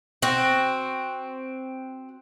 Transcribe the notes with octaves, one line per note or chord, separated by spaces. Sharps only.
C4 F#4